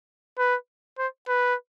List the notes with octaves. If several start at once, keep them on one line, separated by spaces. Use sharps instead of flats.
B4
C5
B4